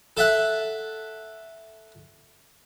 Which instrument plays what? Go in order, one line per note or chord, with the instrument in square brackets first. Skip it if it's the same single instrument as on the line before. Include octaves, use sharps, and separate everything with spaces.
[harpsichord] A4 E5 F#5